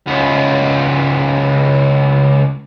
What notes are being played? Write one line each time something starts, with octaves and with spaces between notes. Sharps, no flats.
C#2 B3